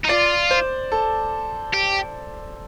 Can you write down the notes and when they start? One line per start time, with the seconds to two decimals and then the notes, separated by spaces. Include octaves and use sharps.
0.05 D#4
0.09 F4 D5
0.51 C5
0.92 A4
1.74 G4